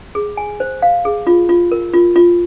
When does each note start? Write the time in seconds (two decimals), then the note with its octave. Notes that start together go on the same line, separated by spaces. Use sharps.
0.15 G#4
0.37 G#5
0.60 C5
0.82 F5
1.05 G#4
1.27 F4
1.49 F4
1.72 A#4
1.93 F4
2.16 F4